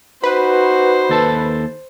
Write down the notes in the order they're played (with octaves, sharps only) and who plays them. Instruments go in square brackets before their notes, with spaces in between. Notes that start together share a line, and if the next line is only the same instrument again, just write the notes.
[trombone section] D#4 F#4 [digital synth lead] B4 [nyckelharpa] C5
[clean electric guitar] D#2 A4 A5